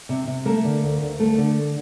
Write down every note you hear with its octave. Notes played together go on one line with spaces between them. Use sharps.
C3
C3
A3 A#3 A#4
D3
D2
D2
A3
D3